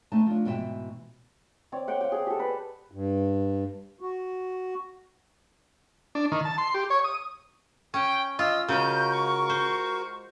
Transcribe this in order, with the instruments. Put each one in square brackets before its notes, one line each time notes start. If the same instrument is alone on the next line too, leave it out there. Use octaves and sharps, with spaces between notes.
[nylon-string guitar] A3 C4 D#4 B4 A5
F3 D4
G#2 B2 E3 E5 G5
[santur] C4 C#5 D5
F#5 G5 D6
F5 G5
G#4 F#5
G4 A4
B4 D5
[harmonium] G2
F#4
[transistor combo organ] D4
D#3
A5
C6
G4
C#5
D#6
[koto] C#4 [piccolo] G5
[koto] F4 [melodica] D#5 [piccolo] E6
[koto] C#3 G#3 [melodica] F#4 A#4 [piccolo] G6
[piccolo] C#6
[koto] C5